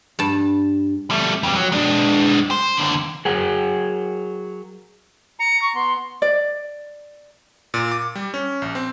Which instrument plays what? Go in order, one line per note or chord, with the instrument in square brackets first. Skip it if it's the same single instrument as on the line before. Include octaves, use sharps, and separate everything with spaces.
[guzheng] G2 A5
[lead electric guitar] G3 A3
F2 G3
F#3
G#3 D4
C5
D#2 D3
[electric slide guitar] F#3 G#4 A#4 F#5 G5
[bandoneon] A#5 [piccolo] C#7
[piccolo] C#6
[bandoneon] B3 [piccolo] C6
[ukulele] D5
[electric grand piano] A#2
D6
G3
C#4
A#1
C4